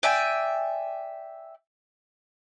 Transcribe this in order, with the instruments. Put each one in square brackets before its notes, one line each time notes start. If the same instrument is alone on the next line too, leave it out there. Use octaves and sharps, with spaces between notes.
[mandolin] D5 E5 G5 G#5